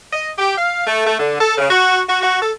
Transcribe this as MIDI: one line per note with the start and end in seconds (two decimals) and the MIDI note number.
0.13 0.30 75
0.38 0.54 67
0.58 0.84 77
0.87 1.03 57
1.07 1.16 57
1.18 1.38 50
1.41 1.57 69
1.58 1.68 49
1.71 2.01 66
2.09 2.19 66
2.23 2.41 66
2.42 2.51 69